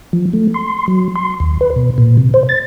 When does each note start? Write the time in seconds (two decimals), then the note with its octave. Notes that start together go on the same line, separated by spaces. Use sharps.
0.13 F3
0.33 A3
0.54 C6
0.88 F#3
1.16 C6
1.40 D#2
1.61 B4
1.76 B2
1.98 A#2
2.17 C3
2.34 C5
2.49 A6